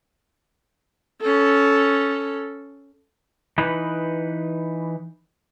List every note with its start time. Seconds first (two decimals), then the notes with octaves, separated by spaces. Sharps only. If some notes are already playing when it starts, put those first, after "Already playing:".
1.22 C#4 A4
3.58 E3 D#4 B4